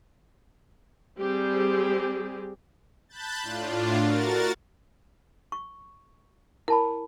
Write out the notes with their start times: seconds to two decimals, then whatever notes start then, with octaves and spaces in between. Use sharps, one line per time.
1.18 G3 C4 G4 G#4
3.09 A5 B5 F#6 G6 A6
3.42 A2 D4 F4
3.99 F#4 A#4 A6
5.52 C#6
6.68 E4 A#4 A5 B5